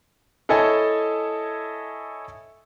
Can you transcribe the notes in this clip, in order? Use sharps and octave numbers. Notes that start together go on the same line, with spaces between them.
E4 A4 C#5 D#5 G#5 A5